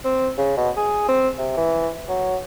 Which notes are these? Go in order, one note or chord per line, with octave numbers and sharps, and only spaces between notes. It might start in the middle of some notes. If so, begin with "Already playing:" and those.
C4
C#3
B2
G#4
C4
C3
E3
F#3